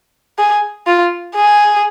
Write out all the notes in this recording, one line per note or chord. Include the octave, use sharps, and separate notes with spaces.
G#4
F4
G#4